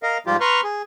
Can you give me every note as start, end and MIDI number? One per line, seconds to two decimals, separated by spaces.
0.03 0.18 70
0.03 0.18 75
0.03 0.18 77
0.26 0.37 44
0.26 0.37 53
0.26 0.37 55
0.26 0.37 65
0.26 0.37 67
0.40 0.61 71
0.40 0.61 82
0.40 0.61 84
0.40 0.61 85
0.40 0.61 89
0.64 0.82 68